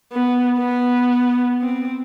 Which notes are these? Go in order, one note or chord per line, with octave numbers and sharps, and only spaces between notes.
B3
B3
C4